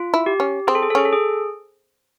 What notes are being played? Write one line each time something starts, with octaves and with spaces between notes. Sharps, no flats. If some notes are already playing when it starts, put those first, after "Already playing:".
Already playing: F4
E4
G4
C#4
C4 G#4
A4
G#4
A4
C#4 G#4
A4
G#4